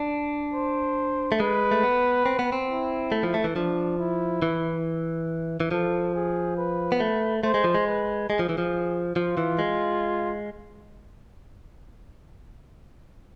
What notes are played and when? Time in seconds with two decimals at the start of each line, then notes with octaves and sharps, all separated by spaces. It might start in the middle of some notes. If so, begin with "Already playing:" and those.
Already playing: D4
0.54 C5
1.32 A3
1.40 G#3 B4
1.71 A3
1.83 B3
2.26 C4
2.39 B3
2.52 C4
2.69 E4
3.12 A3
3.23 F3
3.34 A3
3.44 E3
3.55 F3 D4
3.98 E4
4.42 E3
5.60 E3
5.71 F3 A4
6.14 G#4
6.57 B4
6.92 B3
7.00 A3
7.43 A3 C5
7.54 G#3
7.64 F3
7.74 G#3
7.87 B4
8.30 G#3 G#4
8.39 F3
8.49 E3
8.58 F3
9.16 F3 F4
9.37 E3
9.59 G#3